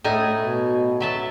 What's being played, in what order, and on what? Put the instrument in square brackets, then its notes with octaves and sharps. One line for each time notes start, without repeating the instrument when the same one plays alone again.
[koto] A2 D#4 G#5 [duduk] A3
[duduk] B2
[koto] F#3 E5 A5